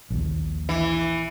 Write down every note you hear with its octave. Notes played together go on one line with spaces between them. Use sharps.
A#1 D#2
E3